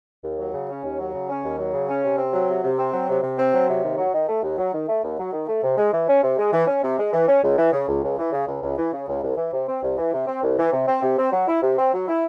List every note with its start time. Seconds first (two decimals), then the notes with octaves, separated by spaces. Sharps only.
0.24 D#2
0.39 F#3
0.54 C#3
0.69 C#4
0.84 D#2
0.99 F#3
1.14 C#3
1.29 C#4
1.44 D#2
1.58 F#3
1.73 C#3
1.89 C#4
2.04 C3
2.18 C4
2.33 F#3
2.49 C3
2.64 C3
2.78 C4
2.93 F#3
3.09 C3
3.23 C3
3.38 C4
3.54 F#3
3.69 C3
3.84 D#2
3.98 F#3
4.14 D#3
4.29 A3
4.43 D#2
4.58 F#3
4.74 D#3
4.89 A3
5.04 D#2
5.19 F#3
5.33 D#3
5.48 A3
5.63 C3
5.78 G#3
5.93 E3
6.08 C#4
6.23 C3
6.38 G#3
6.53 E3
6.68 C#4
6.83 C3
6.99 G#3
7.13 E3
7.28 C#4
7.43 C#2
7.58 E3
7.73 C#3
7.89 C#2
8.04 C#2
8.18 E3
8.32 C#3
8.47 C#2
8.62 C#2
8.78 E3
8.93 C#3
9.08 C#2
9.23 C2
9.37 E3
9.53 C3
9.68 C4
9.83 C2
9.98 E3
10.13 C3
10.27 C4
10.43 C2
10.58 E3
10.73 C3
10.87 C4
11.03 C3
11.18 C4
11.32 F#3
11.48 E4
11.62 C3
11.78 C4
11.93 F#3
12.08 E4